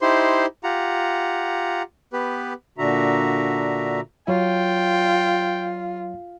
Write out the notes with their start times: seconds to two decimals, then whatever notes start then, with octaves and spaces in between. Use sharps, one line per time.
0.01 D#4 E4 G4 C5 C6
0.64 F4 G4 F#5 A#5
2.13 B3 G4 B4
2.78 A#2 D3 D4 F#4 E5 A#5
4.28 F#3 F4 C#5 G5